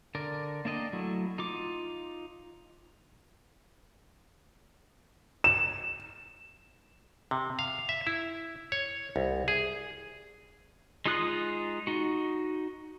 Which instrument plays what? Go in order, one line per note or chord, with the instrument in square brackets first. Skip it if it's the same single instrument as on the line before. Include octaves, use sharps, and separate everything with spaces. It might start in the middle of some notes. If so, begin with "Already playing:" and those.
[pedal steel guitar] D3 A#4 D5
A#3 D4 D5 D#5 G5
F#3 A3 E4
D#4 F4 D6
[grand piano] E7
[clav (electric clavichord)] C3
F5
E5
E4
C#5
C2
G#4
[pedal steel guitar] G#3 D#4 F4 D#6 F#6
D#4 F#4